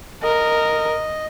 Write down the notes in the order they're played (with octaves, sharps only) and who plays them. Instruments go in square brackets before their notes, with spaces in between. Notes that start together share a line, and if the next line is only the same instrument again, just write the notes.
[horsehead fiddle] A#4 [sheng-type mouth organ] D#5